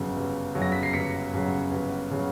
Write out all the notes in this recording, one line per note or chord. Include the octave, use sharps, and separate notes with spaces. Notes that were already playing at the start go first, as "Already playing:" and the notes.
Already playing: G1 F#2 C#3 F#3
G1
F#2 C#3 F#3
A#6
B6
C7
G1 B6 C#7
F#2 C#3 F#3
G1
C#3 F#3